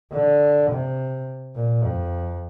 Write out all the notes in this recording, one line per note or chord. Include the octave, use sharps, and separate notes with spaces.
D3
C3
A#2
F2